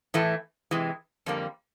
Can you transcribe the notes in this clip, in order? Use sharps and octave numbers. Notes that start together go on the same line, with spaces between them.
A2 E3 A3
C3 E3 G#3
F2 D3 G3 A#3